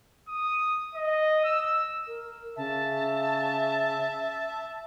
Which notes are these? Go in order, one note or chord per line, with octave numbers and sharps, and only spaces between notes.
D#6
D#5
E6
A#4
C#3 E5 A5